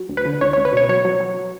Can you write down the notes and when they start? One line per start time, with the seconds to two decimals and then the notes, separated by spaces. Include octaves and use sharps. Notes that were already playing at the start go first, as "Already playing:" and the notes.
Already playing: F#3
0.09 D2
0.17 B4
0.25 D3
0.41 C#2 C#5
0.53 C#5
0.57 C#2
0.65 B4
0.72 B2 C#5
0.89 F#3 C#5
1.05 F#3
1.20 F#3